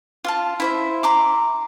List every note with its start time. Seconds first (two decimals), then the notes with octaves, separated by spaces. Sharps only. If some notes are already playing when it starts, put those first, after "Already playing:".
0.24 F4 F5 A5
0.60 E4 C5 E5
1.03 A#5 C6 D6